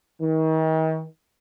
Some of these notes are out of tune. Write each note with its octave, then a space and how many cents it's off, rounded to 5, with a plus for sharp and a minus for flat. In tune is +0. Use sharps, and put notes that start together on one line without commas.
D#3 +40